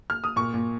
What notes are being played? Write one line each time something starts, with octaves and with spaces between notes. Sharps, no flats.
F6
D#6
A#2 C#6
A#2